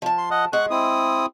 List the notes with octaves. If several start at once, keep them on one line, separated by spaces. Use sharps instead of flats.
F3 A5
C6
D#5 F#5
G#3 G#4 F#5 C#6 F#6
C4 E4 D#6